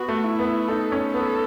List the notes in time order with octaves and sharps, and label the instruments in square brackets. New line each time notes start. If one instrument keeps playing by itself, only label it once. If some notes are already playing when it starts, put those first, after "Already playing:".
Already playing: [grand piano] B3 [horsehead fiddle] F#4
[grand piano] A3
[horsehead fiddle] E4
[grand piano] B3
[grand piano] D#4 [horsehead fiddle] A4
[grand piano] C#4
[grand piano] B3 [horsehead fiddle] A4